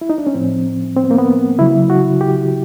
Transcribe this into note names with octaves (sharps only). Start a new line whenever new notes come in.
E4
D#4
D4
C#4
A2 F3 C4
C4
B3
A#3
B3
C#3 F#3 E4
F#4
G4